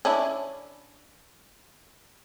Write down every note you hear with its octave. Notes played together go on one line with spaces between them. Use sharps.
C#4 D4 E4